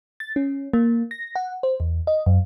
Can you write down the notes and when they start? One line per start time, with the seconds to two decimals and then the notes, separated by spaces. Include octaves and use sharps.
0.20 A6
0.36 C#4
0.73 A#3
1.11 A#6
1.36 F#5
1.63 C5
1.80 E2
2.07 D#5
2.26 F#2